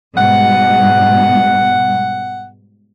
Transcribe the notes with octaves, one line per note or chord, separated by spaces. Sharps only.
G#2 B2 G3 F#5